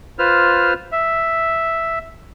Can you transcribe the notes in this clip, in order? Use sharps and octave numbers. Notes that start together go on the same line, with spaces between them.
F4 B4 C5 F6
E5